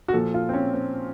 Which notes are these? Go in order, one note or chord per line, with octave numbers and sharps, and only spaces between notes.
F#4
A#2 F3 A4
F4
C4
C#4
C4